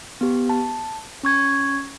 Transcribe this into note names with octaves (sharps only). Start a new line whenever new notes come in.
B3 G4
A5
C#4 C#6 G#6